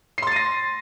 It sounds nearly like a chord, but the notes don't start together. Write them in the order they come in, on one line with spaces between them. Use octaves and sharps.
C7 C6 A6 D#7 A#6